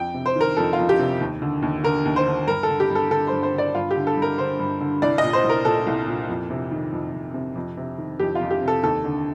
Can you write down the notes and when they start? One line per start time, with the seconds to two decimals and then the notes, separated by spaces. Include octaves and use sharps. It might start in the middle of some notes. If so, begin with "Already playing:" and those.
Already playing: F2 G5
0.14 C3
0.26 C5
0.36 D#3 A#4
0.57 F2 A4
0.73 F4
0.79 F2
0.89 G4
0.99 C3
1.21 D#2
1.42 D3
1.62 D#2
1.84 D3 A#4
2.05 D#2
2.16 C5
2.27 D3
2.47 G2 A#4
2.63 A4
2.69 D3
2.80 G4
2.90 G2
2.95 A4
3.11 D3 A4
3.27 C5
3.32 G2
3.43 C5
3.53 D3
3.58 D5
3.75 G2 F4
3.91 D3 G4
4.07 A4
4.17 G2
4.22 A#4
4.38 D3 C5
4.59 G2
4.80 D3
5.02 C2 D5
5.18 D#5
5.23 A#2
5.33 C5
5.44 C2
5.50 A#4
5.65 A#2 A4
5.87 C2
6.07 A#2
6.29 F2
6.50 C3
6.71 D#3
6.92 F2
7.14 F2
7.34 C3
7.56 F2
7.77 C3
7.98 D#3
8.19 F2 G4
8.35 F4
8.41 F2
8.51 G4
8.61 C3
8.68 A4
8.83 D#2 A4
9.04 D3